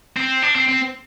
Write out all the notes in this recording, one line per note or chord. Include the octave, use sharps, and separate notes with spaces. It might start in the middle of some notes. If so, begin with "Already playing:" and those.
C4
D4
C4
C4